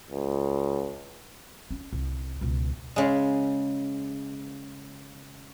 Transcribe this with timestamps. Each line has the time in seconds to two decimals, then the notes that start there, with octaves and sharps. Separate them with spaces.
0.11 C#2
1.71 C#4
1.93 C2
2.41 C#2 B2
2.96 C#3 G#3